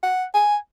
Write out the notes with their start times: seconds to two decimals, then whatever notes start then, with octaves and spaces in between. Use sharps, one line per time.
0.03 F#5
0.34 G#5